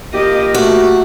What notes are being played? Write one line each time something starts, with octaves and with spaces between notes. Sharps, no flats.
A#3 F4 G4 D#5
A3 F#4